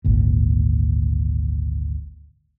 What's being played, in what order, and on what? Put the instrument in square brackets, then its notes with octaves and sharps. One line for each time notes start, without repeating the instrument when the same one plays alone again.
[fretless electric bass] G#1 D2 A#2